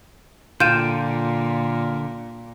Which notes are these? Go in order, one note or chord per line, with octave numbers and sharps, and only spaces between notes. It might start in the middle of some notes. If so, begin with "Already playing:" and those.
A#2 D3 F4 G5 G6 D#7 E7